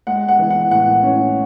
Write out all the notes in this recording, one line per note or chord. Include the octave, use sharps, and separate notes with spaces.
G#3 F#5
F#5
E3
F#5
A2 F#5
C#4